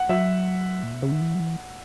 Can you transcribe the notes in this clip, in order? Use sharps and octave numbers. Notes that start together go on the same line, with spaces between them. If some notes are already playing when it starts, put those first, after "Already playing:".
Already playing: F#5
F#3 E5
A#2
B2
C#3
D#3
E3
F#3
E3